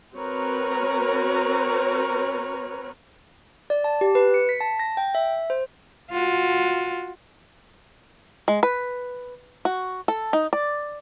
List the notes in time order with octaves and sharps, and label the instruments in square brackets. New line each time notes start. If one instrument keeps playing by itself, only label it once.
[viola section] C4 F#4 A#4 B4 C#5
[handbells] D5
A5
G4
B4
C#7
B6
A5
A#6
G5
E5
C5
[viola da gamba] F4 F#4
[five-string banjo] G#3
B4
F#4
A4
D#4
D5